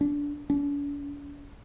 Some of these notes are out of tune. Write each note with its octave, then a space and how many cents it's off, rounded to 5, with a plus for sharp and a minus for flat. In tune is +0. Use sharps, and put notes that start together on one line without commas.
D4 -20
D4 -45